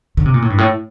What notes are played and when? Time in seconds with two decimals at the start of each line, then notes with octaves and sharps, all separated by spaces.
0.17 D3
0.26 C3
0.34 A#2
0.42 A2
0.50 G2
0.58 A2